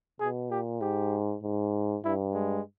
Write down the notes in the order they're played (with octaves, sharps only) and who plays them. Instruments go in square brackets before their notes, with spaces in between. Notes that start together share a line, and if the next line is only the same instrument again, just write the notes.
[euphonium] B2 [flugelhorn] G#4
[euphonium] A#2 [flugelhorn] G4
[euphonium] G#2 [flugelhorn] G4
[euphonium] G#2
[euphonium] G2 [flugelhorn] E4
[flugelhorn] G#3